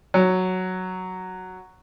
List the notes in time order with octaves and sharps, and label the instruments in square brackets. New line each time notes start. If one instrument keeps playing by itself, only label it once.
[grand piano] F#3